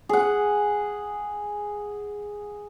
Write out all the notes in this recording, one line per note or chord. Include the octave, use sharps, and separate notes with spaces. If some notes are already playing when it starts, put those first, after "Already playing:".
G#4 F#5